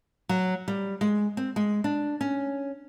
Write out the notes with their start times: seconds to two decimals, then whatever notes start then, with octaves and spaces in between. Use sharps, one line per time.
0.29 F#3
0.68 G3
1.01 G#3
1.37 C4
1.56 G#3
1.84 D4
2.21 C#4